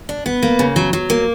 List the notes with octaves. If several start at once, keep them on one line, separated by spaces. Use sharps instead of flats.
D4
B3
A#3
C#3
F#3
F#3
A#3